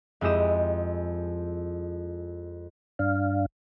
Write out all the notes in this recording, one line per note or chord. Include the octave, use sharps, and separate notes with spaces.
F2 G#3 E4 G4 D#5 E7
G2 D4 F5